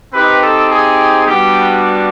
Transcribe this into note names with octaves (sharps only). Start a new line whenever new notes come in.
C4 D#4 G4 B4
A4
G#4
G3 B3 D4 F#4 G4